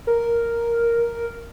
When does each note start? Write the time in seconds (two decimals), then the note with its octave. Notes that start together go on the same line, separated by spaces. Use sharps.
0.07 A#4